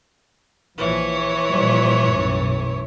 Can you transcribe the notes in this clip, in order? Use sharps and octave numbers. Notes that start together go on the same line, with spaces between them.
A#1 E3 F3 C#5
A#2 F3 G3
B1 F#2 A2